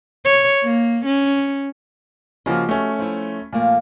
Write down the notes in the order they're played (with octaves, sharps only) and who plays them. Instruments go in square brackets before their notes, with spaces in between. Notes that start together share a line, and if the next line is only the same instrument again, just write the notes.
[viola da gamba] C#5
A#3
C#4
[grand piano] C#3 F3 A#3 [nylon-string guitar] F#4 G4 D#5
[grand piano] A3 C#4
[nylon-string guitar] F3 E4
[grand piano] A#2 [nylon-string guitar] F3 A3 A#3